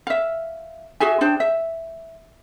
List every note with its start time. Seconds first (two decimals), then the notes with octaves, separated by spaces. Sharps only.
0.07 E5 F5
1.00 F#4 G#4 E5 G#5
1.21 D4 G#4 C5 G5
1.40 E5